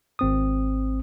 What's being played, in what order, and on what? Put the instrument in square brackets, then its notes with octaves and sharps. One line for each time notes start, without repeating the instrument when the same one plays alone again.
[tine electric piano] G#1 C4 D#6